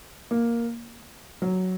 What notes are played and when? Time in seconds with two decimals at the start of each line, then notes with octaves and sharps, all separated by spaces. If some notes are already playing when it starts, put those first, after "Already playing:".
0.31 A#3
1.42 F#3